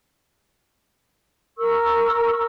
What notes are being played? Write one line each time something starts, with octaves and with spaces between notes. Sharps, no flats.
A#4 C#6 E6